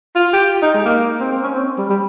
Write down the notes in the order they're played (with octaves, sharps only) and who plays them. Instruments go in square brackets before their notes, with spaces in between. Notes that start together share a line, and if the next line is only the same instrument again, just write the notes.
[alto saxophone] F4
G4
D#4
G#3
A#3
C4
C4
C#4
C4
G3
G3